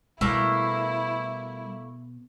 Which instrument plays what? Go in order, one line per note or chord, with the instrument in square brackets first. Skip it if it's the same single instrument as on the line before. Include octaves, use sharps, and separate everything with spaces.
[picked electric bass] B2 [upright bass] G3 [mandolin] A3 A#3 [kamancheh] E4